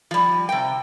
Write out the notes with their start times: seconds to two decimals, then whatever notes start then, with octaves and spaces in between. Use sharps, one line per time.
0.11 F3 G3
0.49 C3 G5